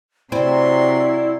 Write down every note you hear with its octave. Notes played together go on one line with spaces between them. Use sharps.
C3 F#3 C4 E4 D5 C6